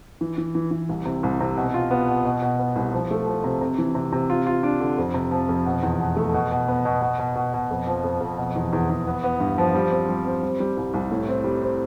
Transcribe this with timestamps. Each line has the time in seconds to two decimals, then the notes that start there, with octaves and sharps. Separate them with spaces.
0.21 E3
0.38 E3
0.55 E3
0.71 E3
0.89 C2
1.05 C3
1.23 C2
1.40 C3
1.57 B2
1.74 F4
1.91 B3
2.08 B2
2.25 B2
2.42 B2
2.59 B3
2.76 C2
2.93 F3
3.11 A3
3.27 F3
3.44 C3
3.61 C3
3.78 E3
3.95 C3
4.12 C3
4.30 F4
4.47 F4
4.63 D4
4.80 D3
4.98 F2
5.14 C3
5.31 F3
5.49 F2
5.66 B2
5.83 E2
5.99 B2
6.16 A3
6.34 B2
6.51 B2
6.68 B3
6.85 B2
7.02 B2
7.19 B2
7.35 B2
7.54 B2
7.71 F2
7.87 F3
8.04 F2
8.21 F2
8.38 B2
8.56 E2
8.73 E2
8.89 E2
9.07 B3
9.24 B3
9.40 G2
9.58 F3
9.74 G3
9.91 C4
10.09 G3
10.25 C4
10.43 G3
10.60 G3
10.77 C2
10.94 C2
11.11 A2
11.28 C4
11.44 G3
11.62 C4